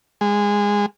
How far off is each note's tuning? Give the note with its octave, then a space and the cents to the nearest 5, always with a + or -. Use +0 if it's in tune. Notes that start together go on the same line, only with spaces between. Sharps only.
G#3 -20